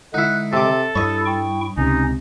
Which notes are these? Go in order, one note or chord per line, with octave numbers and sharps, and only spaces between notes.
D3 G#3 D#4 E4 F#5
C3 A4 D6
G2 E4 C#5 D#5
E4 G5 C#6
C#2 C3 C#4 D#4